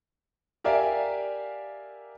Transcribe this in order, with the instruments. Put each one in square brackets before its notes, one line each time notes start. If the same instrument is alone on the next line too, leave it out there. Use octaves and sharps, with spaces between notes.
[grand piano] G4 A#4 D5 E5 F5 G#5